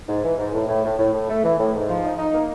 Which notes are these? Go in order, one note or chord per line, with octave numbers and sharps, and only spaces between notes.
G#2
E3
G#2
A2
A2
A2
A2
A2
A3
E3
A2
G#2
F3
D#4
D#4
A#3